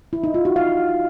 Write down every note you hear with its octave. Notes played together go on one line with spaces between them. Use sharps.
E4
D#4
F4
F#4
F5